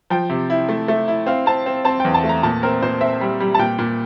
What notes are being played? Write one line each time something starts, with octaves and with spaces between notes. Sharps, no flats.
F3 G5
C3
E4
A3
A3
E4
C4 F5
C4 A5
C4
C4 A5
E2 G5
A5
A3
A#5
A#2 A5
C4 A#4
A#2 C5
C4 E5
G3
G3
A5
A#2 G5
A#2